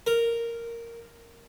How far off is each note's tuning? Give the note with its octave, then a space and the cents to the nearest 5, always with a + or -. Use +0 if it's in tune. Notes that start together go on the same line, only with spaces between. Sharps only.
A#4 -5